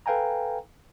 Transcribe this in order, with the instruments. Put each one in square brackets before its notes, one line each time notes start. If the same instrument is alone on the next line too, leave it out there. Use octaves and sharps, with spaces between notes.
[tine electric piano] A4 B4 F5 G5 G#5 A#5